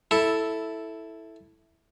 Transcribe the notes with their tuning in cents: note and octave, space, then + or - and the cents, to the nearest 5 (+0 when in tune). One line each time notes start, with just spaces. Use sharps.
E4 -5 A4 +0